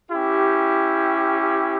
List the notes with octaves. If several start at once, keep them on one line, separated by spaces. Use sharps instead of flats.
C#4 E4 G4